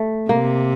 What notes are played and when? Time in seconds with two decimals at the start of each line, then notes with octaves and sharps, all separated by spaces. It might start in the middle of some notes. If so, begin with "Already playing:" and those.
Already playing: A3
0.29 C3 A#3